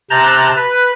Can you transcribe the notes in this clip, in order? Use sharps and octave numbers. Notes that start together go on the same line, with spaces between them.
C3 A5 A#5 F#6 G6
B4